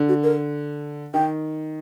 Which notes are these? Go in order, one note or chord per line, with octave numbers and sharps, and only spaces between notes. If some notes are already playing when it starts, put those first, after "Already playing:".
Already playing: D3
F#4
A#4
D#3 G5